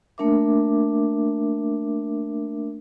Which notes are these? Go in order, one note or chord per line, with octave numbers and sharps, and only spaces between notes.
A3 A#3 D4 A#4 E5 D6